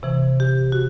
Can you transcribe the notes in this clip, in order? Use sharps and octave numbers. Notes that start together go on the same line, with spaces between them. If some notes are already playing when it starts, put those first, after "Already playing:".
C3 E3
G4
F#4